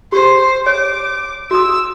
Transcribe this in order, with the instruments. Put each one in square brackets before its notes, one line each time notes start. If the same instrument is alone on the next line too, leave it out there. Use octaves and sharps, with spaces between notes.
[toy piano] G4 [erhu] C5
[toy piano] C#5 [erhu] D6
[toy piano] F#4 D#6 [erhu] E6